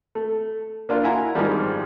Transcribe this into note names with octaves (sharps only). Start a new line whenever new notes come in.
A3
A#3 D4 F4
E4 F#4 G#5 A#5
G#2 D#3 F3 G3